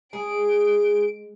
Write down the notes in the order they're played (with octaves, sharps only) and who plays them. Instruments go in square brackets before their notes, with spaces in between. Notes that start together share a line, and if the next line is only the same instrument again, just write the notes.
[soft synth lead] G#3 [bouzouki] G#4 [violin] D7